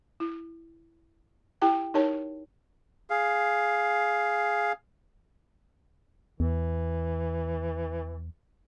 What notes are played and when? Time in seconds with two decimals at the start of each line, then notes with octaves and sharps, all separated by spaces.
0.20 E4
1.62 E4 G4 G5 A5
1.94 D#4 G4 A#4 C#5 A5
3.10 G#4 F5
6.40 E2 E3